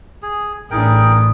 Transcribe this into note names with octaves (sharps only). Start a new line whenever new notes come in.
G#4
A1 D4 E4 G#4 A#4 G5 D#6